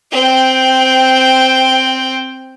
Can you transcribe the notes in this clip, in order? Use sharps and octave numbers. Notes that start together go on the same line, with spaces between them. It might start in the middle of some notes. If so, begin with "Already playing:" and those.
C4 G5